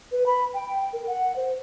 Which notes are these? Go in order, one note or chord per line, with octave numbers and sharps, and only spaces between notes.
B4
B5
G5
A#4
F#5
C5